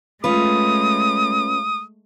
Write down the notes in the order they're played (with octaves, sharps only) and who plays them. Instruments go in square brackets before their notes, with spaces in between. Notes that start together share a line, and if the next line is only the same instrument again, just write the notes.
[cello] G#3 A3 [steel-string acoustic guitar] C#4 F4 B4 [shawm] D#6